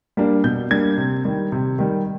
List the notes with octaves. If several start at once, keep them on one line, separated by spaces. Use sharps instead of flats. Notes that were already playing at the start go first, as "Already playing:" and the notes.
G3 A#3 D4
B2 G6
G3 A#3 D4 G#6
C3
D#3 G3
C3
D#3 G3